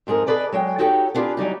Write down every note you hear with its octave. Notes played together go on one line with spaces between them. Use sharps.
F2 G#2 G#4 A#4
G#4 A4 B4 D5 D#5
F#3 G#3 G5
D#4 F#4 G4 A4 C#5 G5
B3 D4 F4 G4 G#4 B4
E3 F#3 G3 D#4